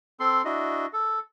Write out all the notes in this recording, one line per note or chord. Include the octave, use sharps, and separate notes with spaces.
C4 A4 C6
D4 E4 F#4 D#5
A4